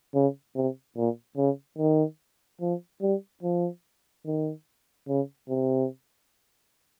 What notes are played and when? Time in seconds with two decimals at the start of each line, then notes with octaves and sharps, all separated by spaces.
0.14 C#3
0.55 C3
0.96 A#2
1.37 C#3
1.78 D#3
2.61 F3
3.02 G3
3.43 F3
4.26 D#3
5.08 C#3
5.49 C3